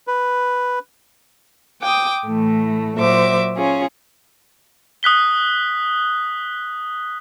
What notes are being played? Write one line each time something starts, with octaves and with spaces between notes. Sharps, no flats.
B4
G5 D6 D#6
A2 E3 A3
A#2 F#3 C5 E5 D6
C#4 F4 G#4 C#5
D#6 F#6 B6 G7